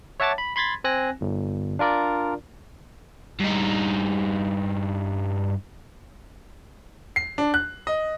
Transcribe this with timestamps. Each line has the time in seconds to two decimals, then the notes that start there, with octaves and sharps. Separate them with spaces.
0.20 C#5 E5 F#5 A5 D6 A6
0.38 B5
0.56 B5 C6 G#6 A6 B6
0.84 C4 G#5 F#6 A#6
1.21 G1
1.79 D4 F4 A#4 D5
3.40 G2 D#4
7.16 C7
7.38 D4
7.54 F#6
7.87 D#5